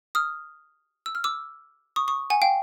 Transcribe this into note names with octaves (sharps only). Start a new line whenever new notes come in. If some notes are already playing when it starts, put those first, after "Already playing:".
D#6 F6
E6
F6
D6 E6
C#6 D#6
C#6 D#6
F#5 G#5
F5 G5